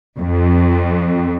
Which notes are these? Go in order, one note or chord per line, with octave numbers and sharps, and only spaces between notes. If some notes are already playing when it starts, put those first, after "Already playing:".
F2